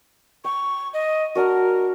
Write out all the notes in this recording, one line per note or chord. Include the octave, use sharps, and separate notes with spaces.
G5 C#6
D#5
D4 F#4 A#4